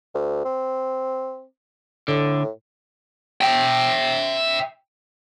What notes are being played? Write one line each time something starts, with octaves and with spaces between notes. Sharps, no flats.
D2
C4
A2 D3
E5 G5